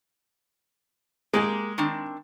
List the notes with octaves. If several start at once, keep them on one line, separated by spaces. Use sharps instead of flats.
G#3 A#3 G4 G#4
D#3 C4 D4